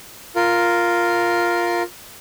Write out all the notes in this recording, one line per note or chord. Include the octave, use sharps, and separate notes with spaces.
F4 A#4